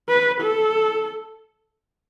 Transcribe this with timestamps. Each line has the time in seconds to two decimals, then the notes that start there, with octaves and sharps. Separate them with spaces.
0.09 B4
0.41 A4